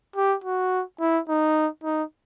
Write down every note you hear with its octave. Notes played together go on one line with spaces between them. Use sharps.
G4
F#4
E4
D#4
D#4